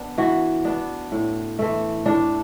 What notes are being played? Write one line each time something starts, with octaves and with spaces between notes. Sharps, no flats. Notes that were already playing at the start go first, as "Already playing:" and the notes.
Already playing: B3 D4
E3 F#4
B3 D4
A2
E3 A3
A2 D4